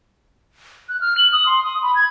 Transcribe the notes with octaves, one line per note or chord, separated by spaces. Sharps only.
F#6
F6
F#7
D#6
C6
D#6
B5
G#6